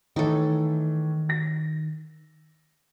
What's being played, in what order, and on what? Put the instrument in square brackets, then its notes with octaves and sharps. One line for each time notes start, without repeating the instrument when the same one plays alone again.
[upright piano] A2 E3 [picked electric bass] D#3 [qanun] D#4 A4
[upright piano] A6 A#6